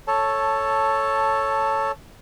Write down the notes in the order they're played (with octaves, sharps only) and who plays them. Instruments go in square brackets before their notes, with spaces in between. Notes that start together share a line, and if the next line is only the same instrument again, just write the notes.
[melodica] A4 C#5 A5